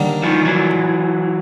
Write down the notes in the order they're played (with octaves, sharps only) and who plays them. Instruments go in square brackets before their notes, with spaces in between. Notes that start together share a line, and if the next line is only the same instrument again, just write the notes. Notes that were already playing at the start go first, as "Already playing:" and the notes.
Already playing: [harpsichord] D#2 D3 G3 A#3
[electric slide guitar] D#3 F3
E3 F#3